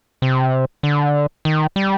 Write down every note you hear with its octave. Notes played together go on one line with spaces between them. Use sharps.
C3
D3
D#3
G3